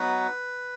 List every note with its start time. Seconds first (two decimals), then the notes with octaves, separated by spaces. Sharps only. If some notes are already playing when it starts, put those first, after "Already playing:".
Already playing: F#3 B3 D#4 F#4 B4